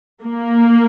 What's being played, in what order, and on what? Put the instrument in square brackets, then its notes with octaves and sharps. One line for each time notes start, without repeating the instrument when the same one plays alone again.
[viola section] A#3